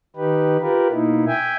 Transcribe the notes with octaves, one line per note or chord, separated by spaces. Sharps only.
D#3 D#4 G4 B4
F4 G4 A#4 B4
B2 A#3 D#4 E4
E5 G5 G#5